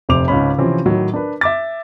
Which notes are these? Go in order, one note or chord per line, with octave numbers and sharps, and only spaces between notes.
F1 C3 C5 D6 F7
C#2 G#2 C#4 B5
C3 E3 F3 C4 C#4
A2 D#3 F#3
D4 A#4 B4
E5 D6 A6